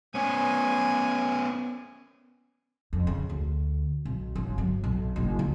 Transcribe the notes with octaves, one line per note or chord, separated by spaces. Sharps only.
B3 C#4 G#5
F2
C#3
D2
B1
G1
F#3
B1
F#1
C#2